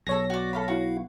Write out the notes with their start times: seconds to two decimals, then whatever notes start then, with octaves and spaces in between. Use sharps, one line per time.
0.07 B1 G#4 A4 C#5 A#6
0.30 F#4 D5
0.53 A4 F5 B5
0.68 E4 F#4 F5